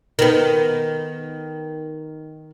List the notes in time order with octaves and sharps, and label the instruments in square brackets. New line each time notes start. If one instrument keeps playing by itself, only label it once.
[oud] D#3 B3